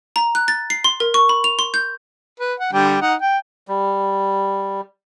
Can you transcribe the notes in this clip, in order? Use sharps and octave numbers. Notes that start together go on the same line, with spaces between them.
A#5
F#6
A6
C7
C6
A#4
C#6
B5
F7
C6
G6
B4
F#5
D3 G3 G5
D#4 F#5
G5
G3